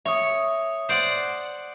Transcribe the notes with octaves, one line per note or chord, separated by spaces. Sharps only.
C#5 E5 D#6
C5 D5 F#5